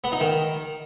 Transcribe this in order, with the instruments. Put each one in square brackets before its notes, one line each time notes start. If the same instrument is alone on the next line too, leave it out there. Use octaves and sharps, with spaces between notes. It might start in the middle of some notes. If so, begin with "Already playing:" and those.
[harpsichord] B3
D#4
D#3